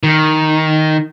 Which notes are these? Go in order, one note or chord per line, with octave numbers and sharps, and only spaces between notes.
D#3